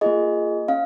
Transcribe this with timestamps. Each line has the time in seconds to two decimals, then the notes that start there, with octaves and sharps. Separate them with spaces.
0.01 A#3 F4 G#4 D#5
0.68 C#4 F5